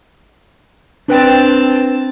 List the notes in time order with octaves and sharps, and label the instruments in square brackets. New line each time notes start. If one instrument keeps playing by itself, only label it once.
[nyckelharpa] C4 A5 [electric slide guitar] D4 B4 G5